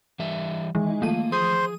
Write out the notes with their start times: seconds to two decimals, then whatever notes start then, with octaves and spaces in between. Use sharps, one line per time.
0.19 E3 G3 E5
0.75 D#3 E3 G#3
1.02 F3 A3 A#3 D#7
1.32 G#4 C5 C6 D#6